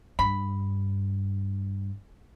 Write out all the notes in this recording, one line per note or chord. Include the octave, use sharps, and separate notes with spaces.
G2 B5